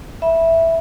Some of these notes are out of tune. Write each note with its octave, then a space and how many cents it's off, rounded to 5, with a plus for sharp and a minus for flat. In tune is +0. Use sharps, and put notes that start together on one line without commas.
E5 +0 B5 -20